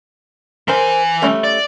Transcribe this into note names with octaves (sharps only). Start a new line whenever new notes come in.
E3 A#4 C5 G#5
G3 A3 C#4
D5